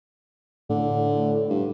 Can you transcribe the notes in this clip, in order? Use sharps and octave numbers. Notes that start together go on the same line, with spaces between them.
A2 D3
G2